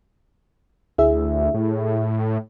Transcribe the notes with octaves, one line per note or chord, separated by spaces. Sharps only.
D2 E4 G#4 E5
A2